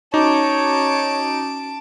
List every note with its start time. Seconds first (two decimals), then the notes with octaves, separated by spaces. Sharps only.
0.14 C#4 D#4 F#4 C#5 A5 D6 D7